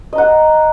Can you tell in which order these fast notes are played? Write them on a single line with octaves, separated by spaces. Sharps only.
D#5 A#5 F#5